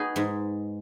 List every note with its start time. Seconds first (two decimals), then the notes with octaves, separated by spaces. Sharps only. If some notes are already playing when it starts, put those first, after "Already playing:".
Already playing: D#4 F#4 G#4 B4
0.16 G#2 G#3